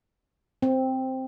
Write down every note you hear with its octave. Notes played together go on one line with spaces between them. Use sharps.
C4